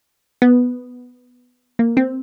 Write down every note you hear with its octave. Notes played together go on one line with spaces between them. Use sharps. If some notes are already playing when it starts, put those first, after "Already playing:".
B3
A#3
C4